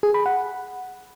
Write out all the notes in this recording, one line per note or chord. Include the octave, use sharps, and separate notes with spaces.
G#4
B5
F#5